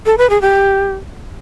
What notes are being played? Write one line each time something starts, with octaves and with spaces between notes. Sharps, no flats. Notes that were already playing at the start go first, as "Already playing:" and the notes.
A4
B4
G#4
G4